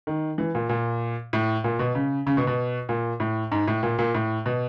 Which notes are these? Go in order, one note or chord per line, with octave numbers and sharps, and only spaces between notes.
D#3
E3
A#2
A#2
A2
A#2
B2
C#3
C#3
B2
B2
A#2
A2
G#2
A2
A#2
A#2
A2
B2